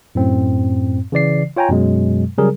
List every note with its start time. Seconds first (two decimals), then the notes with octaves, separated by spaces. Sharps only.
0.15 F#2 A2 C4
1.12 C#3 E3 D5 C7
1.56 F4 C#5 G5 G#5 A#5
1.69 F#2 B2 F#3 G#3
2.38 C#3 F#3 G3 G#4 A#4